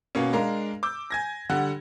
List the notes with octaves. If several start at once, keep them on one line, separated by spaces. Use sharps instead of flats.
B2 A#3 B3 C#4
G#3 D4 A#4 F5
D6 E6 G6
G#5 G#6 A#6
D3 G3 F#5